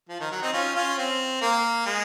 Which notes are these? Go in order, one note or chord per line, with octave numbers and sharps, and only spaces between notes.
F3
D#3
F#3
C4 D#4
C#4 F4
C#4 F4
C4
A#3
G#3